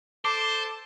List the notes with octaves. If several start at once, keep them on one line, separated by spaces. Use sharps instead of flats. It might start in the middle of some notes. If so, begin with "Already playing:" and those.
A4 C5 A5 D6